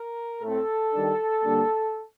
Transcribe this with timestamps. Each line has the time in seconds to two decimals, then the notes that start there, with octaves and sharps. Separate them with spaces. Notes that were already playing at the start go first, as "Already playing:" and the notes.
Already playing: A#4
0.41 A2 A3 C4 A4
0.92 D#3 G3 D4
1.44 D3 G3 A#3 D4